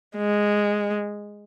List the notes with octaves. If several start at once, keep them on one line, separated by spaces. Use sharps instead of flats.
G#3